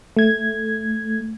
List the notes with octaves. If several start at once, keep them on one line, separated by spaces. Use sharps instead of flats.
A3 G#6